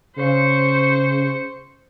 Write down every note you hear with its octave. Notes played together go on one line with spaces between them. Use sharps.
C#3 C5 C#6